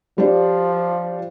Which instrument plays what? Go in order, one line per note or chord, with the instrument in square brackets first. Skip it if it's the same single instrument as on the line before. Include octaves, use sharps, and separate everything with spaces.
[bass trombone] F3 [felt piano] G3 D4